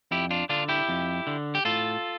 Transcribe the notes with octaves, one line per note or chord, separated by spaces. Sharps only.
F2 E4 G4
D4 F4
D3 D4 F4
E4 G4
F2
D3
G4
A2 F4 A4